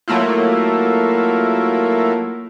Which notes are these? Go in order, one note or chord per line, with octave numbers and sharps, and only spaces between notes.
F#3 A3 A#3 E4 F4